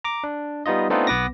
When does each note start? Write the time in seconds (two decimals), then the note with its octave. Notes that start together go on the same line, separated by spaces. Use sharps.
0.04 A#5 D6
0.24 D4
0.66 G3 B3 D#4 F4 D#5
0.90 A3 B3 C4 D4 D#4 F4
1.07 B1 B3 B4 D6 A#6